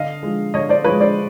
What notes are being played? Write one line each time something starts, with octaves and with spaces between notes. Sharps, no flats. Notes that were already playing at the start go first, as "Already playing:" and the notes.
Already playing: D3 D#5 F5
F3 G#3
D3 C#5 D#5
C5 D5
F3 G#3 B4 C#5
C5 D5